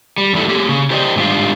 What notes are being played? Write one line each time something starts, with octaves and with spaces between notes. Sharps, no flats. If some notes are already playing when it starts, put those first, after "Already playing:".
G3
E2 G3 E4 A4
A#3 G4 G#4
C#3 G#4
G4 C5 D5 D#5 F#5 G5
G#2 D#3 G3 D4 F4